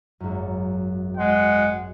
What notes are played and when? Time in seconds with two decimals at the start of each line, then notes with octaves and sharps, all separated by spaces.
0.20 G#1 F#2
1.18 G#3 F#5